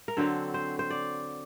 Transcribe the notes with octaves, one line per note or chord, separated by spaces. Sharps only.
A#4
D3 F#3 C4 A4
C5
C5
D5